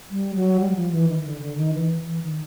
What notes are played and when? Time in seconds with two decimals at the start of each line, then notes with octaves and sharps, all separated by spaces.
0.10 G3
0.35 F#3
0.60 G3
0.71 F#3
0.75 F3
0.92 E3
1.08 D#3
1.24 D3
1.41 D3
1.57 D#3
1.74 E3
2.06 E3
2.22 D#3